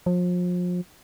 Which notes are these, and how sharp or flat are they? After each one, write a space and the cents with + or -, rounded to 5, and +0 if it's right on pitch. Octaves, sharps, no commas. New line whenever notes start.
F3 +35